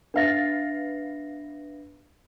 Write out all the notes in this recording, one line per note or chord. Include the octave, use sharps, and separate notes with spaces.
B3 D4 E5 F5 A6 A#6